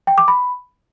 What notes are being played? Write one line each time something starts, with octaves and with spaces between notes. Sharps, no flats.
G5
D6
B5